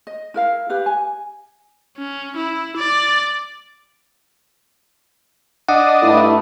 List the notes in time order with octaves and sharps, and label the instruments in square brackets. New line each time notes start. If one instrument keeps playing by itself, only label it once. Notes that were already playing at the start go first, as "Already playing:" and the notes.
[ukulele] D#5
E4 A#4 F5
G4 B4 F5
G#5
[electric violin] C#4
E4
D5
[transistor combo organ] D4 D#5 [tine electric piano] F#5
[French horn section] G2 A3 [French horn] E4